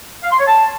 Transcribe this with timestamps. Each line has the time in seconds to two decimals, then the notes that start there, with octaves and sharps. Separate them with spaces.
0.24 F5
0.32 C6
0.39 C#5
0.47 A5